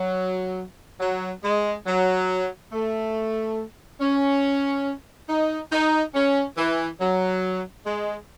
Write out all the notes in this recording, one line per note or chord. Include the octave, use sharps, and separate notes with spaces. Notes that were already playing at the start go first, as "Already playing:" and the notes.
Already playing: F#3
F#3
G#3
F#3
A3
C#4
D#4
D#4
C#4
E3
F#3
G#3